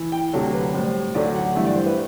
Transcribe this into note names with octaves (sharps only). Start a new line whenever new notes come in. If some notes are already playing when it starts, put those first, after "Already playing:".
Already playing: E3
G5
D2 C3 F#3 A4
B4
A2 G3 C5
D2 D3 F#3 A3 D5
F#5
G2 E3 A3 E5
D5
C5
B4